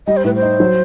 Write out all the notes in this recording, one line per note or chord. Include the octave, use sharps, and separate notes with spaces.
G3 D#5
C5
A2 B4
C5
D#4
F#3